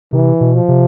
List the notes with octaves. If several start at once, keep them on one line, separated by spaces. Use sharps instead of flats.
C3 E3
B2
F3
C3